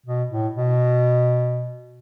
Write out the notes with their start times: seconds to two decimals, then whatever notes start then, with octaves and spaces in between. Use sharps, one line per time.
0.06 B2
0.31 A2
0.55 B2